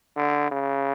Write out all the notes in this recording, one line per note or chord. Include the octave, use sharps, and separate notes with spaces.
D3
C#3